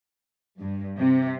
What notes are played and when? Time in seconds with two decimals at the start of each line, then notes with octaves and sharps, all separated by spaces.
0.59 G2
0.97 C3